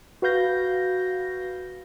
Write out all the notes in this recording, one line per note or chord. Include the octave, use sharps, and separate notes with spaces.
F#4 B4 F5 G6 A#6